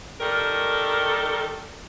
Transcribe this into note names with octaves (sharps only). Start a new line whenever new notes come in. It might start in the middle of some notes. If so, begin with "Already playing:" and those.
D#3 G3 A4 A#4